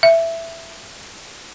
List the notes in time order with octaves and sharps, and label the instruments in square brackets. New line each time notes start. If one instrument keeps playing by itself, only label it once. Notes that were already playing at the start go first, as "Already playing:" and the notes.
[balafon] E5